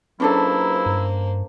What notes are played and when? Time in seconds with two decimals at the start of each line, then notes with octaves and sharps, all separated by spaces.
0.20 C#2 F#3 A#3 C#4 D4 E4 A4 C5
0.86 G2